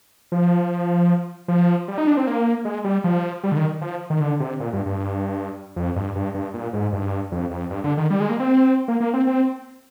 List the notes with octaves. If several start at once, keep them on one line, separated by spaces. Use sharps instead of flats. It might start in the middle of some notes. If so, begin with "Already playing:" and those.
F3
F3
G3
D#4
D4
C4
A#3
G#3
G3
F3
G3
D3
D#3
F3
D#3
D3
C3
A#2
G2
G2
F2
G2
G2
G2
A#2
G#2
G2
F2
F2
G2
D3
D#3
G3
G#3
A#3
C4
A#3
A#3
C4
C4